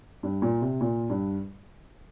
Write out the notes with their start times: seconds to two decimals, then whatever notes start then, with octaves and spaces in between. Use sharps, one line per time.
0.23 G2
0.42 A#2
0.62 C3
0.81 A#2
1.10 G2